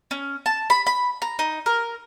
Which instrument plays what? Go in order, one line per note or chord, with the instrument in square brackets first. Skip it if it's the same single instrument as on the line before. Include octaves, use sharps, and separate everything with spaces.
[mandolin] C#4
A5
B5
B5
A#5
D#4
A#4